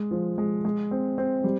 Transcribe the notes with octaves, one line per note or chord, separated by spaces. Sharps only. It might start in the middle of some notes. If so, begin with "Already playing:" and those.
Already playing: G#3
F3
G#3
G#3
C4
C4
G3